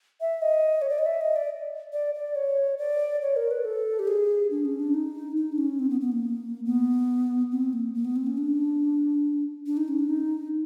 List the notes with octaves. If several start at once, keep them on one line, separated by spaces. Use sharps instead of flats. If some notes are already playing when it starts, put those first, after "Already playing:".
E5
D#5
C#5
D5
D#5
E5
D#5
D5
D5
D5
C#5
D5
C#5
A#4
B4
A4
G4
G#4
D4
C#4
D4
D#4
D#4
D4
C#4
C4
B3
B3
A#3
B3
C4
A#3
A#3
B3
C4
C#4
D4
D4
D#4
C#4
D4
D#4